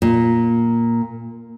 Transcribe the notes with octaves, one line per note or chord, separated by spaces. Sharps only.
A#2